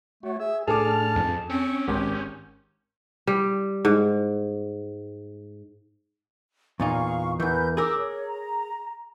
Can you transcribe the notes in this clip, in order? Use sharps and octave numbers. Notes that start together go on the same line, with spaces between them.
A3 F#4 C#5
G#4 E5
A2 D4 G#4 A4 A5 D6 F6
F2
C4 C#4 C#6
G#1 G4 G5
G3
G#2
E2 A#2 D#4 F5 C#6
E2 E3 A#4 B4 G6
G#4 A#4 D6 E6
C#5
A#5